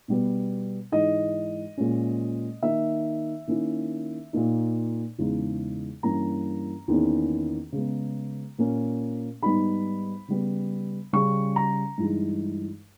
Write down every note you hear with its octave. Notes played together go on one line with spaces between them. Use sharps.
B2 G3 B3
G#2 E3 G#3 D#4 D#5
A#2 G#3 C#4
D#3 A#3 D#4 E5
D#3 A#3 C#4 E4
A#2 A#3 D#4
E2 C#3 G#3 D#4
G2 E3 A#3 C#4 A#5
E2 D#3 A#3 C#4
C#3 G#3 B3
A#2 A#3 C#4
G#2 G3 B3 D#4 B5
C#3 G3 B3
C#3 G3 C#4 C#6
A#5
G2 E3 G#3 D#4